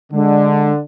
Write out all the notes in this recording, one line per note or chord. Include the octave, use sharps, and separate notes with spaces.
D3 G#3